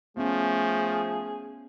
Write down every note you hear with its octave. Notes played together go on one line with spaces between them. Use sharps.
F3 A3 B3 C#4 G#4